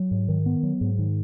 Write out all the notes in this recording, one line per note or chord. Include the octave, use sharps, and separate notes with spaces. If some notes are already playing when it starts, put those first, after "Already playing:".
Already playing: F#3
G#2
D#3
B3
F#3
G#2
D#3